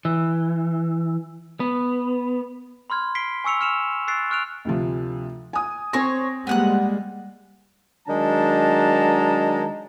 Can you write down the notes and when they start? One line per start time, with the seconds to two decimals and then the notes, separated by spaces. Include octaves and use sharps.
0.05 E3
1.60 B3
2.90 B5 C6 F6 G#6
3.15 B6 C7 D7 G7
3.44 G#5 C#6 E6 C#7 F7
3.61 F6 C#7 E7 F7
4.07 C#6 E6 F#6 A6 C7 D7
4.30 C#6 F6 F#6 D7 F7
4.65 D2 C3 F3
5.53 G#5 D#6
5.93 C4 C5 C#5 G#5 A#6
6.47 G3 G#3 A#3 B3 F#5 F#6
8.08 D#3 F#3 G#3 D4 A5 A#5